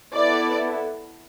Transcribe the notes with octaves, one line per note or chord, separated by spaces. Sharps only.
B3 E4 A4 D5